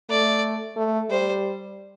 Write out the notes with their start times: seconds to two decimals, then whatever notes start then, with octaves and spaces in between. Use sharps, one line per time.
0.09 A3 D5
0.76 A3
1.10 G3 C5